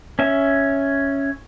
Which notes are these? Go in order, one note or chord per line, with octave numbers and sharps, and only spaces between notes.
C#4 E5